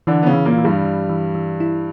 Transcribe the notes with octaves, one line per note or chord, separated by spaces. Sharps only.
D3 E3 D4
B3
C#3 C#4
E3
A#2 A#3
E3
G2 G3
E3
E3
E3
E4